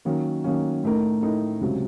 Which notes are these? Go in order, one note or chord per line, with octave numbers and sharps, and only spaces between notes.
D#3 F#3 A#3 C#4
D#3 F#3 A#3 C#4
A2 A3 D#4 A#4
A2 A3 D#4 A#4
C#2 C3 F#3